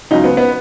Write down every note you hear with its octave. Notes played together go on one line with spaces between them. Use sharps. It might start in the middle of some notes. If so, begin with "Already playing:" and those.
C#2 C#3 F#3 D#4
B3
B3